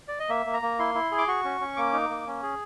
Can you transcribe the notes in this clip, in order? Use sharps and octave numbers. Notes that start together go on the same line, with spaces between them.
D5
D#5
A#3 E5
A#3
A#5
A#3
E4 C6
E4
G#4
D6
F#4 C#6
C#4
C#4
A#3 D6
D#4
A#3
C#4
G#4